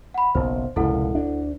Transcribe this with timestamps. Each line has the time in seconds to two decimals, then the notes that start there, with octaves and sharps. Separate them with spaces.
0.14 F#5 B5
0.35 F#1 B1 C5
0.76 F1 C#2 A#2 E4 A4 F#5
1.15 D2 D4